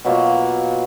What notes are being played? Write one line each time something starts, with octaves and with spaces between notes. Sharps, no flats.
B2 F#3 A#3 F4